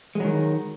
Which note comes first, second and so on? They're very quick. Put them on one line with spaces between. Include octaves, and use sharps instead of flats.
G#3 F#3 D#3